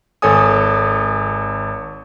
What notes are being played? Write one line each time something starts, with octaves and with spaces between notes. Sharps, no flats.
G#1 A4 C#5 G#5 D#6